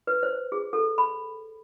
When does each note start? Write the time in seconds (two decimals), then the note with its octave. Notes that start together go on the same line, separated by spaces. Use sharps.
0.07 B4
0.23 C5
0.52 G#4
0.73 A4
0.98 B5